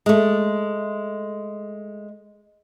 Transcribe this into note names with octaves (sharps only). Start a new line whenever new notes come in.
G#3 A3